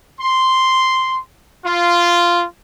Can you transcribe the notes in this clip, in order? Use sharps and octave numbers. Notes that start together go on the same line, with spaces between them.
C6
F4